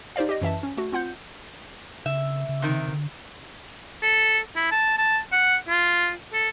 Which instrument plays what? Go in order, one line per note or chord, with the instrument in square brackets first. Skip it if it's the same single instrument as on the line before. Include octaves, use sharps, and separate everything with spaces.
[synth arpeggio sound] D#4 G4 C5 D5 F5
G4 D#5
F#2 E3 E5 A5
C#4
A3 F#4
C4 F4 F#5 G6
[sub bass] C#3 [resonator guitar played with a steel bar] E5
[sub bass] C#3
[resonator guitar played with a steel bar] C3 D#3
[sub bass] D3
[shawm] A4
E4
A5
A5
F#5
F4
A4